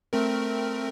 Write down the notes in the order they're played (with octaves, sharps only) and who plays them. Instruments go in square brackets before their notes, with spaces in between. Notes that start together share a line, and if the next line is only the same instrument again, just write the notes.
[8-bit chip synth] A3 C4 A#4